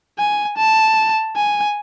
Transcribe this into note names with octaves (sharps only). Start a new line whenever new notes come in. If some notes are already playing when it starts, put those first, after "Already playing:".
G#5
A5
G#5